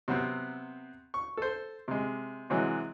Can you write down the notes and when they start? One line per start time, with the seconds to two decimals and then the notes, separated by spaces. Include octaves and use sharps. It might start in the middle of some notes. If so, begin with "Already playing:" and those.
0.08 C3 F#3 B3 C4
1.14 C#6
1.37 A4 C5
1.88 C3 G#3
2.50 C3 E3 F#3 G#3